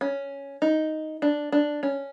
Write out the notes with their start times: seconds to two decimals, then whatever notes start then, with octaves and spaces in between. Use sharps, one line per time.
0.01 C#4
0.62 D#4
1.22 D4
1.52 D4
1.83 C#4